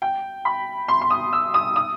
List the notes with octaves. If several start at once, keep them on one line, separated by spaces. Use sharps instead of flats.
G5
B5
C6
C6
D#6
E6
D#6
D#6